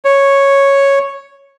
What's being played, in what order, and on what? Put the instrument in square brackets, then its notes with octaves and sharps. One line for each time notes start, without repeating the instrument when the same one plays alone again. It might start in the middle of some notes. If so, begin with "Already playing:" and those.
[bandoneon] C#5